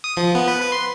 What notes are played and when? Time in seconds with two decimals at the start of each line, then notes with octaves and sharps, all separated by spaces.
0.04 D#6
0.17 F3
0.35 B3
0.48 B4
0.61 B4
0.72 C6